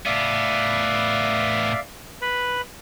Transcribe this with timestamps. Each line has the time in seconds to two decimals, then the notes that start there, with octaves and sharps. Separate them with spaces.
0.06 A2 B3 D5 E5 F5
2.22 B4 B5